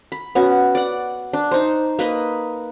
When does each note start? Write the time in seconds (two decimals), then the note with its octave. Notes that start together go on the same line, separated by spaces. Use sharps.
0.12 B5
0.35 B3 C#4 F#4
0.75 D5 F#5
1.33 D4
1.51 D#4 C5
1.99 A#3 B4 D#5